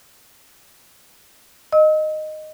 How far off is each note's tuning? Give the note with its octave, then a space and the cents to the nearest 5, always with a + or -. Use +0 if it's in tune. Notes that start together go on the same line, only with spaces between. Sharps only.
D#5 -10 E6 -40